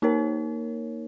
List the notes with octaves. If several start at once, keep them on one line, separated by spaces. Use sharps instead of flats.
A#3 D#4 A#4 C#5